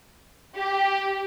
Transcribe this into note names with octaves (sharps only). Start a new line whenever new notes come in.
G4